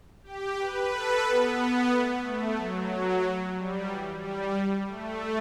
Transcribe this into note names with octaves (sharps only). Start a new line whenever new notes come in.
G4
B4
A4
B3
A3
A3
F#3
G3
E3
G3
A3